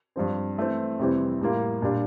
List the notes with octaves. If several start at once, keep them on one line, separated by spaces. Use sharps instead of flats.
G2 F3 C4
E3 A3 C4
F2 C3 E3 G3 C4
A2 G3 A#3 F4
A#2 G3 D4 F4